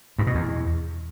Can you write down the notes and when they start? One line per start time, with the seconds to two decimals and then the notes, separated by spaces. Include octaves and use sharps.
0.19 G2
0.27 B2
0.35 E2